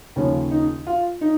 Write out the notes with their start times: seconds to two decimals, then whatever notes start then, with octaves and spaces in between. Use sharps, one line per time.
0.16 D#2 C#3 F3 C#4
0.51 D#4
0.87 F4
1.21 D#4